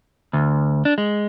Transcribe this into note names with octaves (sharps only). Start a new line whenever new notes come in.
D2
D4
G#3